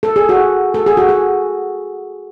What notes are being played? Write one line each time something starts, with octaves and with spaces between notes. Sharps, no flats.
A4
G#4
F#4
A4
G#4
F#4
G#4